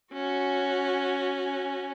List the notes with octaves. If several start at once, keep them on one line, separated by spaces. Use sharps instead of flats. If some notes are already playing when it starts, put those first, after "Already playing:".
C#4 F#4